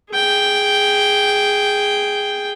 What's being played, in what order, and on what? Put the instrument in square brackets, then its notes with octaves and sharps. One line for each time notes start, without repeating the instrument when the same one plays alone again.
[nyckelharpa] G#4 G5